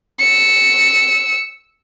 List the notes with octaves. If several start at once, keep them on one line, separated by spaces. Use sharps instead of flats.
E6 C#7